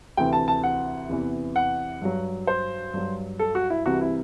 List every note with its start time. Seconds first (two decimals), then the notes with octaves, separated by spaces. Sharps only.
0.17 D2 C3 E3 G5
0.33 A5
0.48 A5
0.63 F#5
1.09 E2 C3 E3
1.56 F#5
2.01 G2 F#3
2.47 C5
2.94 G2 F#3
3.39 A4
3.55 F#4
3.70 E4
3.86 C2 C3 E3 F#4
4.01 E4